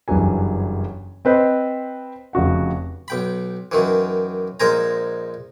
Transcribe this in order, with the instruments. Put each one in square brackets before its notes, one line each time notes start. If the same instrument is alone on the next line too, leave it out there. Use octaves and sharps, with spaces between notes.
[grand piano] F#1 G2 E3 F#3 G#5
C4 B4 C5 D#5
F1 C#3 F#4 F#5
[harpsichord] B1 G5 B5
F#2 D#3 E3
A#1 G#3 A#4 C5 G#5 A#5